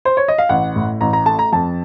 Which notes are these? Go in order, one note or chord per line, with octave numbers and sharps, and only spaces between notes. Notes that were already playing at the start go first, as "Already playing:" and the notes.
C5
C#5
D#5
F5
A1 F#5
A2
A1 A#5
A#5
A3 A5
A#5
F2 A5